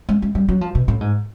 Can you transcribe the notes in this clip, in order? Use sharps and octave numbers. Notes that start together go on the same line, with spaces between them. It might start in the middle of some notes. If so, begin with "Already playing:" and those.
G#3
G#3
G3
F#3
F3
B2
A2
G#2